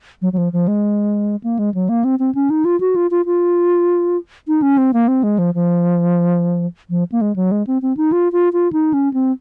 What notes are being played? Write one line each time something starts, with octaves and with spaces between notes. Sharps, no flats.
F#3
F#3
F3
F3
G#3
A#3
G#3
F#3
A#3
C4
C4
C#4
D#4
F4
F#4
F4
F4
F4
D#4
C#4
C4
A#3
C4
G#3
F3
F3
F3
A#3
G#3
F#3
G#3
C4
C4
D#4
F4
F4
F4
D#4
C#4
C4